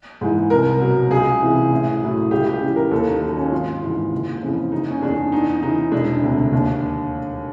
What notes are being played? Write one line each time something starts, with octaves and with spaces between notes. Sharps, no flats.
G#2 E3
C2 A#4
B2 F#3
C#2 G#4
C3 E3
A1
A2 F#3
C#2 G4
G4
C#3 E3
A#4
D#2 A4
D#4
D#3 F#3
C#4
G#1 F4
G#2 E3
F#1
F2 C#3 E3
F#1 D#4
C#4
E2 C#3 D4
E2 D#4
C#3 E3 D#4
E1 D4
D2 C3
D#2